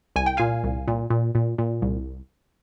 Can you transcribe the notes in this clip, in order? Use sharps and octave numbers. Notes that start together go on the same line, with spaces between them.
C2 G#5
G5
A#2 F5 G#5
C2
A#2
A#2
A#2
A#2
C2